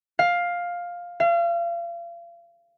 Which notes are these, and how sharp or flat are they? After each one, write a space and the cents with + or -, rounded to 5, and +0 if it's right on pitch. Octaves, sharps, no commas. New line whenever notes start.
F5 +10
F5 -35